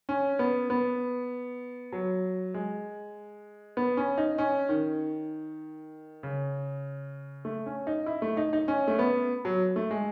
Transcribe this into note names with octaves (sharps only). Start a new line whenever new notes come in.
C#4
B3
B3
F#3
G#3
B3
C#4
D#4
C#4
D#3
C#3
A3
C#4
D#4
E4
A3
D#4
D#4
C#4
A3
B3
F#3
A3
G#3